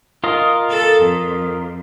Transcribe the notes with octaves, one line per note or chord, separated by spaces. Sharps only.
F4 A#4 D#5
A4
F2